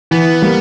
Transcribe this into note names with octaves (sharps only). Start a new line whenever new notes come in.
E3 B3
G3 A#3